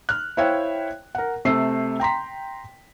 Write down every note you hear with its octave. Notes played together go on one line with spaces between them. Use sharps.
F6 F#6
E4 C5 C#5 E5 F5 G5
A#4 F#5
C3 A3 E6 C7
G5 A#5 C6 B6